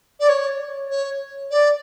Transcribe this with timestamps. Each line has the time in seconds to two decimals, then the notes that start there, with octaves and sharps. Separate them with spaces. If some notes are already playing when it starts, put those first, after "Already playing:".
0.20 D5
0.29 C#5
0.90 C#5
1.51 D5